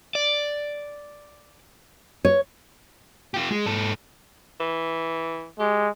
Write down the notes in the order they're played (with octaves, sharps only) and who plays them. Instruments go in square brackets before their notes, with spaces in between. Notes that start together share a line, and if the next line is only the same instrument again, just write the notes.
[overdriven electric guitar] D5
[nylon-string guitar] C#5
[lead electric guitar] F4 G4
G#3
G#2 A4
[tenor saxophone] E3
[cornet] G#3 [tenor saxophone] G4